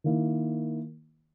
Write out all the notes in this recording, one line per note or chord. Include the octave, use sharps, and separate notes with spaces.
D#3 A#3 E4